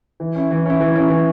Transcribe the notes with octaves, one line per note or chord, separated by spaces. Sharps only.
E3
C#4 E4
E3
C#4 E4
E3
C#4 E4
E3